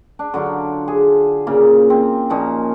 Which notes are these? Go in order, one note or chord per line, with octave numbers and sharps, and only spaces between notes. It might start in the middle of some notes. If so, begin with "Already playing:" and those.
D4
D3 F#3 D4 F4
G#4
A#2 C#3 A#3
C4
A#2 F3 C#4 D#4